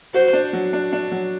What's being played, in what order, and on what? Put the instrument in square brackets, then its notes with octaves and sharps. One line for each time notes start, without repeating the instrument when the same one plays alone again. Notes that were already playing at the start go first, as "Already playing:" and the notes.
[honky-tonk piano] F#4 [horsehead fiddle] C5
[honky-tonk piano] D4
F#3
D4
D4
F#3